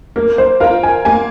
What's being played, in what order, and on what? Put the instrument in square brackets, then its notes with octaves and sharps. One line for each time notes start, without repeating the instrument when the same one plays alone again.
[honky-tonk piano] A#3 [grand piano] A#4
[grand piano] C5
[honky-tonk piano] F4 A#4 [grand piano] F5
[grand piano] G#5
[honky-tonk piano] A#3 [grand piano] G#5